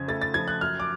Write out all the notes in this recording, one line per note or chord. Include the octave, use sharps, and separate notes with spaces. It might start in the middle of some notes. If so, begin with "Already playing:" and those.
Already playing: F2 C#3 G#6
A3 A6
A6
F3 G#6
F#6
F#2 F6
D6